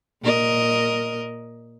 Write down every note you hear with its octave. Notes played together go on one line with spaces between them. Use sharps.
A#2 A#4 D#5